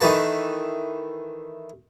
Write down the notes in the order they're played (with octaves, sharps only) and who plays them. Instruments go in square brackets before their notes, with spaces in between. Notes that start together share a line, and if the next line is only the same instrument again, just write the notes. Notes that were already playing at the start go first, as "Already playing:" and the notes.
[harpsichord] D#3 E3 A3 B4 A5